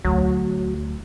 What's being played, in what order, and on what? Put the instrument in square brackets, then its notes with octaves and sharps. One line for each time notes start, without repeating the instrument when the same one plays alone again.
[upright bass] D2 [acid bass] F#3